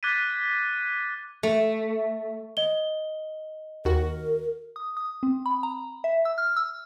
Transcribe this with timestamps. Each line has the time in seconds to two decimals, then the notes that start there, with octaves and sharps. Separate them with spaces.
0.03 D6 F#6 G#6 A6 B6 D#7
1.43 A3
2.57 D#5 G7
3.85 D#2 F#4 A#4
4.76 D#6
4.97 D#6
5.23 C4
5.46 B5
5.63 A#5
6.04 E5
6.25 E6
6.38 F6
6.56 E6